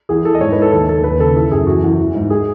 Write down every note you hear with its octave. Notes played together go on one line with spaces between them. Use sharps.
E2 G#4
E2 A4
D#5
G#2 C#5
B4
E3 A4
D#2 A4
D#2 A4
D#2 B4
C#3 A4
E3 A4
F#2 G#4
E2 F#4
E2
E3
G#2
G#4